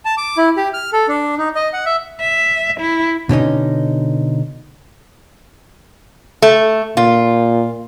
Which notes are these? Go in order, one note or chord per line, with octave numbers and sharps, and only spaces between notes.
A5
D6
E4
G4
F6
A4
D4
D#4
D#5
F#5
E5
E5
E4
B2 D3 C#4 D#4
A3
A#2 F4